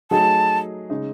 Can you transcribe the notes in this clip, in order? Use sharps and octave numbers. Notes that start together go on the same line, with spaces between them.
F#3 A3 D#4 G#4 A5
C#3 G#3 D#4